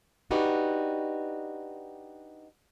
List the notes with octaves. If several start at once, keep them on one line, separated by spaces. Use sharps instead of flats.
D4 D#4 F#4 G4 B4